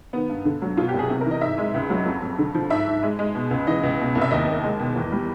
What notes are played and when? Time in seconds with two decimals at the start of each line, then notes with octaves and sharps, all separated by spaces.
0.13 D#3 B3
0.29 G2
0.45 D3
0.62 F#3
0.77 B2 F4
0.88 G4
0.94 C2
0.99 G#4
1.10 C3
1.21 A#4
1.26 E3
1.31 D#5
1.41 G#2 E5
1.58 G#3
1.74 C#2
1.90 F#3
2.06 F2
2.22 F2
2.38 D3
2.55 F3
2.70 G#2 E5
2.87 G#2
3.03 G#3
3.19 G#3
3.35 B2
3.51 C#2
3.67 E3 D#5
3.83 C#2
4.00 B2
4.15 C2
4.21 E5
4.31 D#2 D#5
4.48 D#2
4.64 G#3
4.79 B2
4.96 E2
5.12 G3